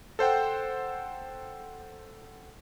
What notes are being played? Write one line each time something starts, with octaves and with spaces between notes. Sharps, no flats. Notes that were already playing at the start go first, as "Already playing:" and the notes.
A4 C5 F#5 G5